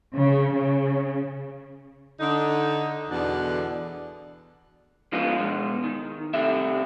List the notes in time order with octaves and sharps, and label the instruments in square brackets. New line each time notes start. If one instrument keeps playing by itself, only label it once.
[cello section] C#3
C#3
[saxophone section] D3 D#4
E2 B2 D3 D4
[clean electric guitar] G#2 D3 F3 B3 D#4 F4
B2 G#3
D#3
C2 C3 A3 E5